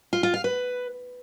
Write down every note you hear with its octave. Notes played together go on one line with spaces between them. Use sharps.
F4
F4
F5
B4